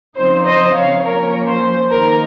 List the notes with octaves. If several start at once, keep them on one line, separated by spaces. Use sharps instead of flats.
C#3 F3 C4 D#4 C5
C5 D#5
C#5 F5
F3 A#3 C#4 A#4 C#5
C5
D#3 A#3 D#4 A#4